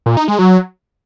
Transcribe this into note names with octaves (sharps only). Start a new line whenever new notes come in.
A#2
D#4
G#3
F#3